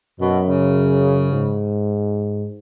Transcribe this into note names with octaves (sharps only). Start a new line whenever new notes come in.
F#2 B2
C#3
G#2